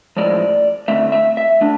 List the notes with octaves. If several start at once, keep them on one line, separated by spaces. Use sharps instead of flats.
A2 F3 G#3 D5
D3 A3 C4 E5
E5
E5
A3 D4